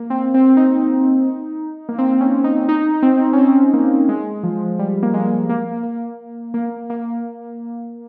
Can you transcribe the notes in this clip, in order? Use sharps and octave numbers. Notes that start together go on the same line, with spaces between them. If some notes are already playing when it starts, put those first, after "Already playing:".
Already playing: A#3
C4
C4
D#4
A#3
C4
C#4
D#4
D#4
C4
C#4
C4
A#3
G#3
F3
G3
A#3
G#3
A#3
A#3
A#3
A#3